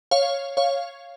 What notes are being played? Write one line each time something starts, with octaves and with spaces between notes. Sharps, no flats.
C#5 F5
C#5 F5